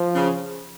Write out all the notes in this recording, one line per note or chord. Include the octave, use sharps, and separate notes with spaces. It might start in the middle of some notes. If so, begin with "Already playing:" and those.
Already playing: F3
C#3